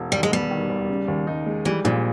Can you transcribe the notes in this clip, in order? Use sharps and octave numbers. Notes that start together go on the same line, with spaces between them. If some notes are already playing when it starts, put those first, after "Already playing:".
Already playing: E1
D#2 G3
G#3
G3 B3
D#3
D#2
C#3
D#2
D#4
G#3
E3 G3
A#1 A#2